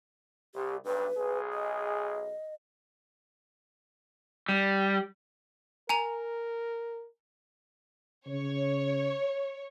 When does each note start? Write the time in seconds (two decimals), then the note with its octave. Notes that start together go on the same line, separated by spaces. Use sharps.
0.55 C2 G4
0.85 B1 G2 B4
1.17 B1 G#4
1.53 D#5
4.49 G3
5.89 A#4 G#5 A#5 F7
8.27 C#3 C#5